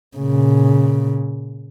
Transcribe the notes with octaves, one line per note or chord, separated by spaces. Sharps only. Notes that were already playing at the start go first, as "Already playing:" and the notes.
A#2 C#3